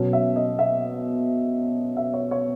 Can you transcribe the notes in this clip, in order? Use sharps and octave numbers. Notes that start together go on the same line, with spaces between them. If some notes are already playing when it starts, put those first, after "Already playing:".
Already playing: B2 F#3 C#4
E5
D#5
E5
E5
C#5
C#5